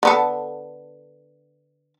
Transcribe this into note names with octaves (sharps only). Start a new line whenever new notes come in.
D3 B3 A4